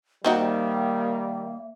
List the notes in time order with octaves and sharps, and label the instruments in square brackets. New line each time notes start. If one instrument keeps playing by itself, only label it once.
[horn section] D#3 G3 [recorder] A#3 [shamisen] C4 D#4 F#4 [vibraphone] E5